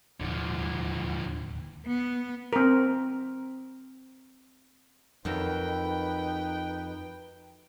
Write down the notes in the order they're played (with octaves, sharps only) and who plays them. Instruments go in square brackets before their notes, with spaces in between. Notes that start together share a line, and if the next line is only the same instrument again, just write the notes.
[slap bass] D1 D#2 B2 [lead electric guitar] D3 F3
[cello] B3
[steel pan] C4 A#4
[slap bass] F2 [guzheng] D#3 F#3 A3 [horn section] D#4 B4 [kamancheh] G5